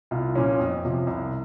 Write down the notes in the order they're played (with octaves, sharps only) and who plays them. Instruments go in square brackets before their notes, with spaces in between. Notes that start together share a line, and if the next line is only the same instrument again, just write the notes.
[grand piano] C2 F4
A#2 F3 C#4
F2
C3 F3
C2